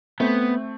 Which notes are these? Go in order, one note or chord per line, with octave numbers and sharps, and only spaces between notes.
A3 B3 C4